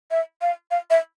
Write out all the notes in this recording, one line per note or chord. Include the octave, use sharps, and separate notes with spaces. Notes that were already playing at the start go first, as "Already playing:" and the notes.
E5
F5
F5
E5